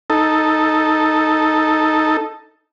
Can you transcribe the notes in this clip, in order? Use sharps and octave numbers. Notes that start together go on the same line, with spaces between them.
D#4 A4